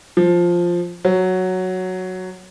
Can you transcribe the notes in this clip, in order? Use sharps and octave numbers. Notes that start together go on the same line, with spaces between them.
F3
F#3